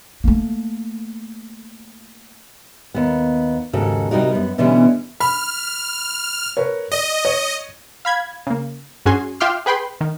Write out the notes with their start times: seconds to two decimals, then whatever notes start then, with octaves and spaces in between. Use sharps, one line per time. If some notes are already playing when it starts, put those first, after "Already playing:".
0.24 A3 A#3
2.94 D#2 B3
3.73 D#2 G#2 C#3 F#4 A4
4.11 C3 G3 D#4 F#4 A#4
4.32 F#2 B3
4.58 B2 D3 E3 G3 B3 C#4
5.20 B5 F6
6.57 A#4 B4 C#5
6.92 D5 D#5
7.25 C#5
8.05 F5 B5 G#6
8.47 C#3 A#3
9.06 G2 C#4 F#4 G#4 G#5 C6
9.40 F4 E5 G5 C6 D6 F6
9.66 G#4 B4 G5 B5 C6
10.01 D#3